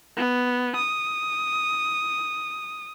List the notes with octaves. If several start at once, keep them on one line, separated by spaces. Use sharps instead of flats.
B3
D#6